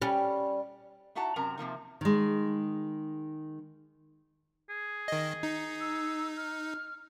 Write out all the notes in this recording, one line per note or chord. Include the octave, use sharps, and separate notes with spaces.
G3 C#4
D#4 E4 F#4 F#5 A5 A#5
F#2 C3 A#4 A5 A#5
C3 F3 A#3 D#4
D#3 G#3
G#4
D#3 D#5
D#4
E6
F6